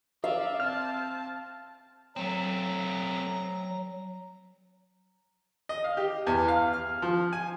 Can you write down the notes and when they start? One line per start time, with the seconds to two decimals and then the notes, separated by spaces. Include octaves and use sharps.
0.24 D5 E5 F5
0.60 C4 A5 F6
2.17 F#3 A3 C4 A#5
5.69 D#5
5.84 F5
5.97 G4
6.27 E2
6.48 F5
6.73 F6
7.02 F3
7.33 G#5